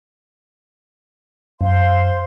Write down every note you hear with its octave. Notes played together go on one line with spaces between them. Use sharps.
F#2 C5 F5 C6